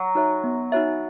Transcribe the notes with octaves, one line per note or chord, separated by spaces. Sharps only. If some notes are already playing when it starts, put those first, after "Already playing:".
Already playing: F#3
D#4 F#4 C#5 E5
B3
D#4 F#4 C#5 E5